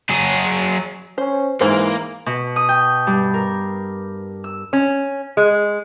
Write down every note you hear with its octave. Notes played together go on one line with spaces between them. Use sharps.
F#3 G#4
C#4 C5
G#2 E3 A#3 C5
B2
D#6
G5
G2
A#4
E6
C#4
G#3